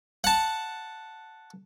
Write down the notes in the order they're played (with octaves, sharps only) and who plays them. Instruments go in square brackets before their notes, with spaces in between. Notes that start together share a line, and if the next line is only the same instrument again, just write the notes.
[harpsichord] F#5 A5